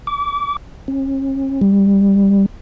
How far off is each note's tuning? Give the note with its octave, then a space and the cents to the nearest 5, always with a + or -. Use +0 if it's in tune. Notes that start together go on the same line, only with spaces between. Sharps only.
D6 -35
C#4 -40
G3 +15